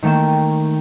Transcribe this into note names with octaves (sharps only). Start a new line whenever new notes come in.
D#3 A3 A#3 G5 E7